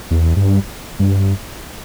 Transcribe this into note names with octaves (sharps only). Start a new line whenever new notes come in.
E2
G2
G2